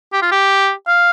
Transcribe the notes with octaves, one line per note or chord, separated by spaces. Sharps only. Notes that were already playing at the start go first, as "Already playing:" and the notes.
G4
F4
G4
F5